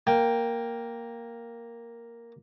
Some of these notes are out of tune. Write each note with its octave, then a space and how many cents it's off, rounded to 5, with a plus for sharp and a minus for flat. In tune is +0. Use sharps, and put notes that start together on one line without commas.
A#3 +0 G5 +0